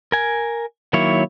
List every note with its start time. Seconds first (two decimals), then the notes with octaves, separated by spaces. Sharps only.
0.12 A#4 G#5
0.93 D#3 F#3 A#3 E4 C#5